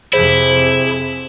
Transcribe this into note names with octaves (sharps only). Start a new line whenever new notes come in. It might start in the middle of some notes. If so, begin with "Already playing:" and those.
F2 C3 E4 G#4 C5